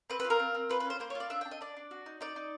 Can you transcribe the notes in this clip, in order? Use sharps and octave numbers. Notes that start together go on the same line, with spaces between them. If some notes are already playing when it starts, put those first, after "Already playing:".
C4 B4
F4 B4
A#4
C4
C4
F4 B4
B4
C#4 C5
A#3 C5
C#5
F4
D5
D4 E5
D4 G5
D#5
D4 D5
D4
F#4
D#4
D#4 D5
D#4